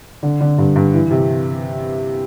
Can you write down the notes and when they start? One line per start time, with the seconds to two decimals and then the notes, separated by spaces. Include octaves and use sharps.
0.23 D3
0.41 D3
0.58 G2
0.76 G2
0.94 E3
1.11 C3